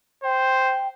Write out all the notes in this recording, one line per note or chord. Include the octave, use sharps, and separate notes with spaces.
C5 G5